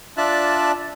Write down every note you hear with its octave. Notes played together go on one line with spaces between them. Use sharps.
D4 F4 D5 E5 A5 F#6